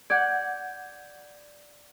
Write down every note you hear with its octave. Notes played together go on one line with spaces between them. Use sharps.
D5 F#5 G6 G#6